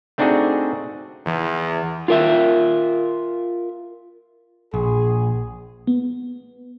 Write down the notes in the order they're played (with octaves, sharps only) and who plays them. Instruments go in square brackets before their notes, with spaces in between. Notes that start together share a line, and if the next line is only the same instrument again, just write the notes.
[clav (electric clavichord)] A3 C4 D4 D#4 F#4 G#4
[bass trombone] E2 [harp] E3
[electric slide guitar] F4 A#4 E5
[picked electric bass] A#1 [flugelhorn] G#4
[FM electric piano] B3